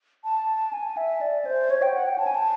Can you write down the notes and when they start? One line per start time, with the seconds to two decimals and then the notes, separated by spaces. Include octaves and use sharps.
0.24 A5
0.73 G#5
0.97 E5
1.21 D5
1.45 C5
1.70 C#5
1.82 G5
1.94 F#5
2.07 G5
2.18 A5
2.27 G#5
2.35 A5